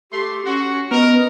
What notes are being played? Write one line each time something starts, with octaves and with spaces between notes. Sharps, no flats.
A3 G4 C6
C#4 F#4
B3 A#4 D#5